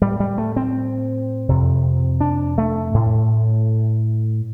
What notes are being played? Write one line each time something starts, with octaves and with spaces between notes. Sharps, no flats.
A2 G3
G3
A3
C4
F2 C3
D4
A3
A2